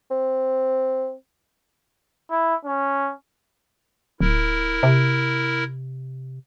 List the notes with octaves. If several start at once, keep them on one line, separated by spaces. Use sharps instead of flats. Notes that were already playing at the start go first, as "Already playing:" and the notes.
C4
E4
C#4
D1 E4 A#4
C3